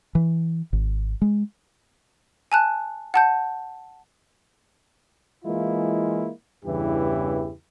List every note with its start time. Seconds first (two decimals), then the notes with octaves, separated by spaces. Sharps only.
0.15 E3
0.73 G#1
1.22 G#3
2.52 G#5 A5 F#6
3.14 F#5 A5 G6
5.45 E3 G#3 A#3 E4 F4
6.65 E2 G2 C#3 E3 E4 G4